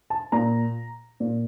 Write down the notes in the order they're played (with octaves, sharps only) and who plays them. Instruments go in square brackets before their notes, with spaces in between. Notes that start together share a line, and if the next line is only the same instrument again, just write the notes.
[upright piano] A5
A#2 A#5
A#2